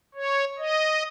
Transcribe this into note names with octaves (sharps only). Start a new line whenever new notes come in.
C#5
D#5